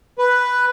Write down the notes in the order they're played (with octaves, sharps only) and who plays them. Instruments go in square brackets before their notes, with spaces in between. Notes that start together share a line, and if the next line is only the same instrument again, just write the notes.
[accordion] B4